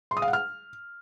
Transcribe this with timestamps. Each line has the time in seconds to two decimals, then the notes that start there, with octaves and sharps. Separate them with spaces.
0.11 C6
0.17 D#6
0.22 F5
0.28 F#5
0.33 F6